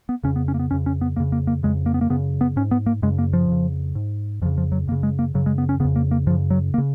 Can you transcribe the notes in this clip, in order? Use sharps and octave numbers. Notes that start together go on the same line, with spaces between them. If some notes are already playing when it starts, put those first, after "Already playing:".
B3
F2 C#3 C#4
B3
C#4
A#3
B3
F2 C#3 C#4
C#4
B3
F2 C#3 A#3
A#3
A#3
F2 C#3 G#3
A#3
B3
A#3
F#2 C#3 B3
B3
G#2 C#4
B3
A#3
F#2 C#3 G#3
A#3
F3
F2 C#3
G#2
F2 C#3 F3
F3
F#3
F#2 C#3 A#3
G#3
A#3
F#2 C#3 F#3
G#3
B3
C#4
F2 C#3 B3
A#3
A#3
F#2 C#3 F3
F#3
A#3
C#3